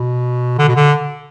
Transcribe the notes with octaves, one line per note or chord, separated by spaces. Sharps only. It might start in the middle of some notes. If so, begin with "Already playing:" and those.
Already playing: B2
D3
B2
D3